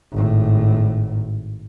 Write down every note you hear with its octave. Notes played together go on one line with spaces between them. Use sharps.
G#1 A2